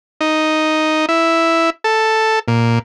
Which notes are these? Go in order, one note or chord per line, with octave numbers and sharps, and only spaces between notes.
D#4
E4
A4
A#2